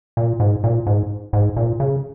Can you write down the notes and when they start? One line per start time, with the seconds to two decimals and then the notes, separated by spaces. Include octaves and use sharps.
0.17 A#2
0.40 G#2
0.64 A#2
0.87 G#2
1.33 G#2
1.57 A#2
1.80 C#3